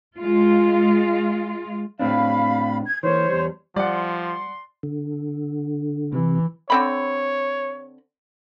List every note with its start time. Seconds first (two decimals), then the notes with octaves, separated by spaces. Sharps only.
0.17 G#3 F4
1.99 A2 C4 D4 F5 B5
2.85 G#6
3.03 E3 A#3 C5 C#5
3.29 E2 G3
3.76 F3 G3 D5 F#5 C6
4.83 D3
6.13 C3 E3
6.70 D3 C4 C#5 B5